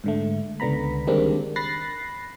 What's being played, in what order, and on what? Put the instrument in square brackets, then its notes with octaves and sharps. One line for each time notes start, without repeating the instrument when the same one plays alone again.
[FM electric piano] G#2 D3 A3
C#2 D3 B3 A#5 B5
D#3 G3 G#3 A#3 C4 D4
B5 F#6 A6 A#6 C7